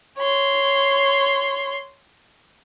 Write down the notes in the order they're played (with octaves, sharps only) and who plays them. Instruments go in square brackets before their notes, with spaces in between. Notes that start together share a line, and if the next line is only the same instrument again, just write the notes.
[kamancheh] C#5 C6